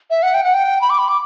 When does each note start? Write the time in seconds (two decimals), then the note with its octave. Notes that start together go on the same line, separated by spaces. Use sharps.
0.10 E5
0.23 F#5
0.34 G5
0.44 F#5
0.54 G5
0.81 B5
0.90 D6
0.99 B5
1.08 D6